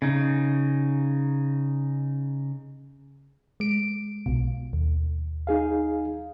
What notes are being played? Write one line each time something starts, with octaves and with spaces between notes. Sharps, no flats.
C#3 D#4
G#3 D7
B1 B2
D#2
D#4 G#4 F5